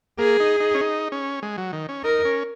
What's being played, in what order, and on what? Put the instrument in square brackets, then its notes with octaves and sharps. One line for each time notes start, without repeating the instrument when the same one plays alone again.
[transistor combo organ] A#3 [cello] G#4
[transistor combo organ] D#4
D#4
C#4
D#4
C#4
G#3
F#3
D#3
C#4
[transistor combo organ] D#4 [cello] A#4
[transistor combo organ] C#4